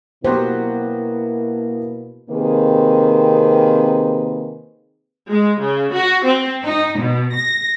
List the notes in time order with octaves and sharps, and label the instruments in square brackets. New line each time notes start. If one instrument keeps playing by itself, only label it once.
[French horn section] B2 A#3 E4 [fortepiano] F#3 B3 G4 [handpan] C5
[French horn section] C3 D#3 A#3 C4 G#4 B4
[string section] G#3
C#3
F#4
C4
D#4
B2
A#6